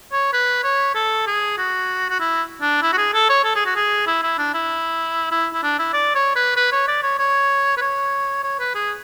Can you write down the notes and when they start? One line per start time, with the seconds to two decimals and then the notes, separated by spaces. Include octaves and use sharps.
0.12 C#5
0.33 B4
0.64 C#5
0.95 A4
1.27 G#4
1.58 F#4
2.10 F#4
2.20 E4
2.61 D4
2.82 E4
2.93 F#4
2.97 G#4
3.14 A4
3.29 C#5
3.44 A4
3.55 G#4
3.66 F#4
3.76 G#4
4.07 E4
4.23 E4
4.38 D4
4.54 E4
5.31 E4
5.54 E4
5.63 D4
5.79 E4
5.93 D5
6.15 C#5
6.35 B4
6.56 B4
6.72 C#5
6.88 D5
7.03 C#5
7.19 C#5
7.77 B4
7.81 C#5
8.43 C#5
8.59 B4
8.75 G#4